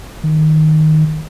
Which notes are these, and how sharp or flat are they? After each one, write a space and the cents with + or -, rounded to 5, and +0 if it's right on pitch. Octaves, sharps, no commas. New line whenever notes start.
D#3 +0